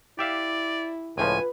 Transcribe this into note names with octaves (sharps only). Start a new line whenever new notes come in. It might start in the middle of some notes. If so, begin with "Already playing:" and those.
E4 G4 D5 E5 F5
C#2 A2 F3 F4 B4 G#5